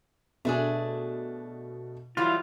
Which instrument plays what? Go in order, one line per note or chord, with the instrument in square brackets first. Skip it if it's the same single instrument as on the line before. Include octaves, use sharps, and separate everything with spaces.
[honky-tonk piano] B2 [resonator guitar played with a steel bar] A3 D4 G#4
[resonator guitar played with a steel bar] E3 F#3 G3 [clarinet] E4 [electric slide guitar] F4